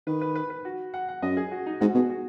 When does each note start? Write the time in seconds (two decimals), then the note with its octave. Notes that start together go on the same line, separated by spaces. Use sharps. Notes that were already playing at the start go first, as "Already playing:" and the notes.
0.07 D#3 B4
0.21 B4
0.35 B4
0.50 B4
0.65 F#4
0.94 F#5
1.09 F#5
1.22 F#2 D#5
1.37 G#4
1.52 F#4
1.66 D#4
1.81 G#2 F#4
1.94 B2 G#4
2.10 F#4